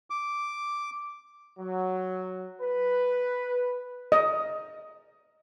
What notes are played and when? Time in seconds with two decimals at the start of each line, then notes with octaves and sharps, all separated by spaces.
0.10 D6
1.59 F#3
2.62 B4
4.12 D#5